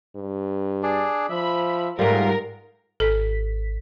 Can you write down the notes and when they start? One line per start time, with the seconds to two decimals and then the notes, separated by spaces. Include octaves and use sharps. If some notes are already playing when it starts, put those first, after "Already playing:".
0.16 G2
0.83 D4 G#4 D5
1.30 F3 E5 B5
1.99 G#2 G3 A3 F4 A#4
3.00 G#1 A4 B6